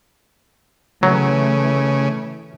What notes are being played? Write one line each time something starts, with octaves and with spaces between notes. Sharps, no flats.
C#3 E3 F#3 A3